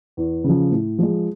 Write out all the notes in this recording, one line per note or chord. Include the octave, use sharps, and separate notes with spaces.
E2
C#3 F3
A2
F3 G#3